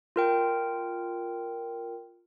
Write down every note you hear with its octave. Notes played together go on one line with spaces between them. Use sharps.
F4 A#4 G5